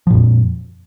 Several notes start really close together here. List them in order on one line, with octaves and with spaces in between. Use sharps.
F3 A#2 F2